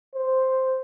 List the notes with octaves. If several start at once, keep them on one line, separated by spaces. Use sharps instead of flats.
C5